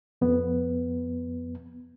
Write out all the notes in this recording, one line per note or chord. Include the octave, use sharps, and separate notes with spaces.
F2 B3